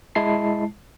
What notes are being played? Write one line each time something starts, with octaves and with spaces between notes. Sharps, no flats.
G#3 E4 A5 C7